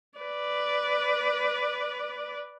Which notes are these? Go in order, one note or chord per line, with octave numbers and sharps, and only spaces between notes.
B4 D5